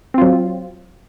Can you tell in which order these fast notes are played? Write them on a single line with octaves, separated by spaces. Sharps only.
C4 F4 F#3